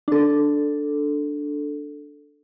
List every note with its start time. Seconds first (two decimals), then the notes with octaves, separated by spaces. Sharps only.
0.08 D4 A4